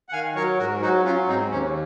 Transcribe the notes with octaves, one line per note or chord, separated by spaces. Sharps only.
F#5
D#3 F5 G#5
F#3 A#4 C#5
G#2 F#4 A#4
F#3 D#4 F#4
F#3 C#4 F4
G#2 C4 D#4
D#2 C#4